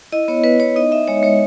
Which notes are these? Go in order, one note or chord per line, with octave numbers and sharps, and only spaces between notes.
E4 D#5
B3 C#5
B3 B4
B3 C#5
D#4 D#5
D#4 E5
G#3 C#5
G#3 C#5